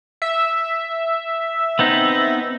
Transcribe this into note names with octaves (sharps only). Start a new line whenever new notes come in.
E5
B3 C4 D#4